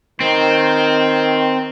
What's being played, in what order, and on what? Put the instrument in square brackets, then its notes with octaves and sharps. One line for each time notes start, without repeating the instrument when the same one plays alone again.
[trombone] D#3 [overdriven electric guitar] C4